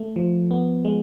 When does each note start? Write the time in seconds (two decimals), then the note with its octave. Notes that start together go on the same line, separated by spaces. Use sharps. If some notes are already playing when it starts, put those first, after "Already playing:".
Already playing: A3
0.16 F3
0.51 B3
0.85 G#3